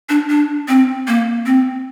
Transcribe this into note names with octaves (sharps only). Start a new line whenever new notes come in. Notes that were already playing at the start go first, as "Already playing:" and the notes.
D4
D4
C4
A#3
C4